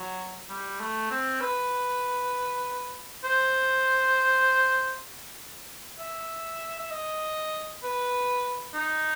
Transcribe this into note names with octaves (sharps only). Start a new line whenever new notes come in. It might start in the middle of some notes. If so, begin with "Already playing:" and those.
Already playing: F#3
G3
A3
C4
B4
C5
E5
E5
D#5
B4
D#4